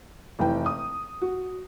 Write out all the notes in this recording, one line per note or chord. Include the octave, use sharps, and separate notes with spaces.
F1 E3 G5
D#6
F#4